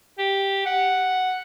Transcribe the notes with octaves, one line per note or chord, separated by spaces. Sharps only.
G4
F#5